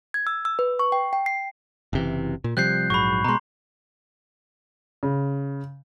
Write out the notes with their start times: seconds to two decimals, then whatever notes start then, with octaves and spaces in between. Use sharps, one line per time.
0.14 G#6
0.27 E6
0.45 E6
0.59 B4
0.79 C#6
0.92 G5
1.13 G5
1.26 C7
1.93 F#1 C3 E3
2.44 A#2
2.57 C3 F3 G3 F#6 G6 C7
2.90 A#1 G#2 F#3 B5 C#6
3.24 B2 G#3 A#5 C6
5.03 C#3